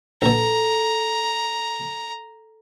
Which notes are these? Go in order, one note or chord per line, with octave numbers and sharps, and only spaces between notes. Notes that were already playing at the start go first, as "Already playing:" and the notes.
A#1 B2 A4 A#5